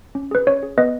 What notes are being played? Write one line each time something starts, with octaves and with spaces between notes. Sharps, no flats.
C#4
G#4 B4
C#4 C#5
G#4
B3 B4 D#5